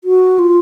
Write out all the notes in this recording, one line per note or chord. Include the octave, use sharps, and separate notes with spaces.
F#4
F4